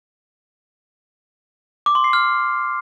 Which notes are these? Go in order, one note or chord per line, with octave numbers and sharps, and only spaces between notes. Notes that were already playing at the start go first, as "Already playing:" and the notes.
D6
C6
C7
F6